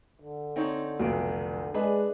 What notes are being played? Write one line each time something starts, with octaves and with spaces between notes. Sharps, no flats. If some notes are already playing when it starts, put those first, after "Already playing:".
D3
C4 D#4 C#5
F1 B1 D7
G#3 D4 G#4 B4